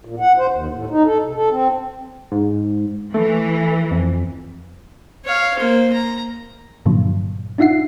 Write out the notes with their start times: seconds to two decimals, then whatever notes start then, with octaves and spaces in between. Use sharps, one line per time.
0.05 A#2
0.20 F#5
0.38 C5
0.52 D#2
0.73 A2
0.90 D#4
1.05 A4
1.23 C3
1.35 A4
1.51 C4
2.32 G#2
3.14 E3 A3
3.91 F2
5.25 C#5 F5
5.57 A#3 C5
5.93 A#5
6.86 G2 A#2 D3 F3 F#3
7.58 D4 D#4 F4 E5 F#5 C7